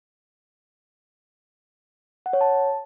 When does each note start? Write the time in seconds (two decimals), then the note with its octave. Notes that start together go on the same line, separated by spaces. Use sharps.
2.26 F#5
2.33 C#5
2.41 A5